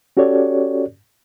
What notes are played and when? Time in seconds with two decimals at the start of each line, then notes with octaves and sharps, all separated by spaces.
0.17 C#4 F#4 G4 A4 C#5 D5